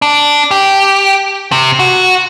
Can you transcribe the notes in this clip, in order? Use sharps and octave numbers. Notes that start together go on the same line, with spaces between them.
D4
G4
C3
F#4